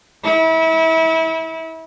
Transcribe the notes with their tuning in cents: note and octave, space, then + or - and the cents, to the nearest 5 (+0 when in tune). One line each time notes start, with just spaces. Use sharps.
E4 -30